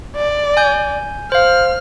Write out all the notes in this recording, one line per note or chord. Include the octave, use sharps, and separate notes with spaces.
D5
G#5 G6
C5 F5 F6